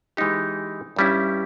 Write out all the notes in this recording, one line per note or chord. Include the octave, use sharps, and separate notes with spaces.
E3 G#3 D#4 G4
G2 G3 C#4 E4